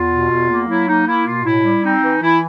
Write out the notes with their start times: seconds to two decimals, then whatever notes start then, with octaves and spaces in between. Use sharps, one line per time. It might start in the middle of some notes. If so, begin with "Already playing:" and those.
Already playing: E2 F4
0.10 B2
0.29 E2
0.48 A#3
0.67 F#3 E4
0.87 A#3 D#4
1.05 A#3 E4
1.24 B2 F4
1.43 A2 E4
1.64 G3
1.83 C4 D#4
2.02 E3
2.21 E3 E4